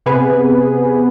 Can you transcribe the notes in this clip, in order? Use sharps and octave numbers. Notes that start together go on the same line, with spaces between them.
C3 B3 G#4 B4